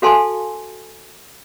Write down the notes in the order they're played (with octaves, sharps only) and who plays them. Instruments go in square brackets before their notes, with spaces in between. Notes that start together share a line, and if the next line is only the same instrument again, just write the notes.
[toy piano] F#4 A4 F5 G#5 A5 C6